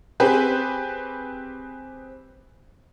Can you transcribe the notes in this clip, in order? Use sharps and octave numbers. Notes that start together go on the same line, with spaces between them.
C4 G4 G#4 B4